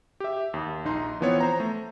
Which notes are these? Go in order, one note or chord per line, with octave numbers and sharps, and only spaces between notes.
G4 E5
D#2
A#1 D#4 C6
E3 F3 B3 C4 C#5
C5 A#5
A3